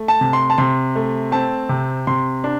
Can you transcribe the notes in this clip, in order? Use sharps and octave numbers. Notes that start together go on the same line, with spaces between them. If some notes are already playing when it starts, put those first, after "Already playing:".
Already playing: A3
A5
C3
C6
A5
C3 C6
A3
C4 A5
C3
C3 C6
D4